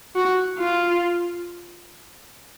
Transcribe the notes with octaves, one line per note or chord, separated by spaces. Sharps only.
F#4
F4